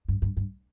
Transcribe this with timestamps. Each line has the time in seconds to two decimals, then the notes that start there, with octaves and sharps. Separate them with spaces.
0.08 G2
0.22 G2
0.37 G2